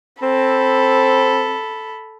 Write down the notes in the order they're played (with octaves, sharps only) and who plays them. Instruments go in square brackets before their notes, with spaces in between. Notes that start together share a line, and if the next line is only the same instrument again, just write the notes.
[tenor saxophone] C4 [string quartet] A4 B5